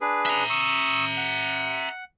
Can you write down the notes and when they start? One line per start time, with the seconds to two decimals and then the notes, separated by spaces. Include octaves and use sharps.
0.01 D4 G#4 B4
0.26 E5 A#5
0.50 C#6 D#6 E6
1.17 F#5